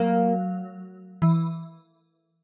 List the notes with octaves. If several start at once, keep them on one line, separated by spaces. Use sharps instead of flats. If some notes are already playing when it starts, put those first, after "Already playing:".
Already playing: F#3 A#3
E3